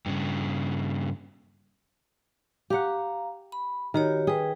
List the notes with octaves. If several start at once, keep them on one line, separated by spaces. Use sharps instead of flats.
G2 C#3
G4 F5 F#5 A#5
B5
D#3 F#4 G4 C#5
G#4 B4 G5